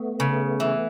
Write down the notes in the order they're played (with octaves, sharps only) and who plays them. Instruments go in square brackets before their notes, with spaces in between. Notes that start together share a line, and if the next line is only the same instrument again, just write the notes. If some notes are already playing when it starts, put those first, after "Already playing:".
Already playing: [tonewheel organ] A3 B3
[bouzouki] C#3
E3